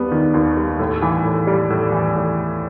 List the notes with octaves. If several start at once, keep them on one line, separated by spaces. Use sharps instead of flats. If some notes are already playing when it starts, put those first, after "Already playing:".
Already playing: D#2 G3 B3
D#3
D#2
G3
A2
E3
A2
G3
A2
E3
A2